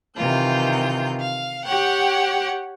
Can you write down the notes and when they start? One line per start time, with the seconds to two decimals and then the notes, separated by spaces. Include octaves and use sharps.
0.17 C3 D#3 E3 F4 G6
1.19 F5
1.65 G4 C#5 F#5 G5